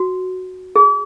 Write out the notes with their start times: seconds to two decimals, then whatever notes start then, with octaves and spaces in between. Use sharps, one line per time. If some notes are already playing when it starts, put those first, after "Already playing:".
Already playing: F#4
0.76 G#4